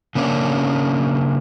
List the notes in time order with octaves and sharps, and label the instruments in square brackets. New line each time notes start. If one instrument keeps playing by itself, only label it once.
[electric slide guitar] C#3 A#3 C#4 D4